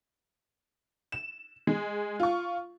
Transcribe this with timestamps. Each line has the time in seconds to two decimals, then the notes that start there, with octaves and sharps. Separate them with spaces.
1.12 E7
1.67 G#3
2.20 F4 C#6